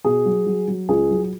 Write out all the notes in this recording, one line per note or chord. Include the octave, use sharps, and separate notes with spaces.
B2 G#4
F#3
F#3
F#3
C#2 G#4
F#3